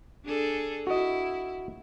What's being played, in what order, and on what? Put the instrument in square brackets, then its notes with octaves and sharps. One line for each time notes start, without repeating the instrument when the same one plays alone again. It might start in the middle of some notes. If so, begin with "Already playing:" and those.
[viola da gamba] D4 G#4 A4
[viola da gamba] E4 [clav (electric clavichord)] F#4 D#5